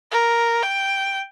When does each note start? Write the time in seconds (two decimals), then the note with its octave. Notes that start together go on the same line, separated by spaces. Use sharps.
0.11 A#4
0.63 G5